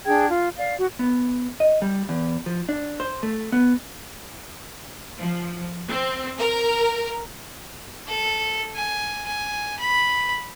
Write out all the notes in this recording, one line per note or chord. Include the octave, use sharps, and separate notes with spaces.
D4 G#4 G5 G#6
F4
D5 F5
F#4
B3
D#5
G3
E2
F3
D4
C5
A3
B3
F3
C4
A#4
A4
G#5
G#5
B5